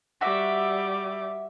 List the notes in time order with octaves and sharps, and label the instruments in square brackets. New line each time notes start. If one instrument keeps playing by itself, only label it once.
[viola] G3 D6 [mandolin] F#4 E5